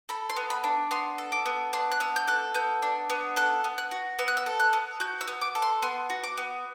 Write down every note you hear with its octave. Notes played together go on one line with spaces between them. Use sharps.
A4 B5
C6
B3
B5
D4
B3 C6
A4
D6
B3
D4 C6
F#6
B3 E6
G6
A4 F#6
B3 G6
D4
B3
A4 F#6
B3
F#6
F#4
B3 E6
F#6
E6
A4
F#6
B3
F#4 G6
E6
B3
D6
A4
C6
B3 C6
F#4
D6
B3